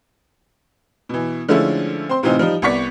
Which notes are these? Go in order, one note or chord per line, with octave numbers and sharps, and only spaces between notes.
B2 E3
D3 F3 G#3 A3 C#4 E4
C4 C6
A2 C3 E3 C4 D#4 F4
F3 G3 D#4
C2 B3 D5 C#6 B6